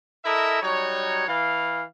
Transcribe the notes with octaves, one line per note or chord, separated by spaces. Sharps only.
E4 A4 A#4 D#5 E5
F#3 G3 D#4 C#5
E3 F5